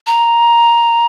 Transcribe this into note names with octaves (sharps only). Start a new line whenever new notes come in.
A#5